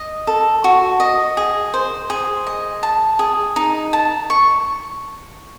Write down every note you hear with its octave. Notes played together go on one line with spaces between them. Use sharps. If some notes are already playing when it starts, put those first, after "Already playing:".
Already playing: D#5
A4
F#4
D#5
G#4
C5
G#4
D#5
A5
G#4
D#4
A5
C#6